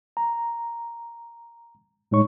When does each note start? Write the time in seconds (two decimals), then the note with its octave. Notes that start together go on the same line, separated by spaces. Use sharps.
0.17 A#5
2.11 A2 G#3 D#4 C#5 C#6